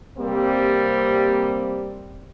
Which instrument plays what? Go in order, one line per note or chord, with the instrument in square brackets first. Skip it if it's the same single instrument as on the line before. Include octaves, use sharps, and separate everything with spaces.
[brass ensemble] C3 G3 A#3 C4